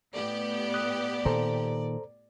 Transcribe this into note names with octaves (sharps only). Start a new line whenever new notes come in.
A2 B3 G4 D5
D#6 F#6
A#2 D#3 A4 C5 A#5